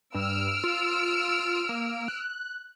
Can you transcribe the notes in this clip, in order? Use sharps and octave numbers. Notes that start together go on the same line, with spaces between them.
G2 E6 F6 D7
F4
A#3
F#6